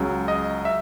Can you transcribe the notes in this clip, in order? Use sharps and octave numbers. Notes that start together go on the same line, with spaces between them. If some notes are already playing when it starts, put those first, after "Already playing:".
Already playing: C#2 C#3 F#3
D#5
E5